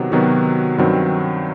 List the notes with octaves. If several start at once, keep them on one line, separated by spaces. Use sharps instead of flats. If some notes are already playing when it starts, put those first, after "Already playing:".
Already playing: C3 D#3 F#3 B3 F#4
C3 D#3 F#3 B3 F#4
G2 D#3 F#3 C4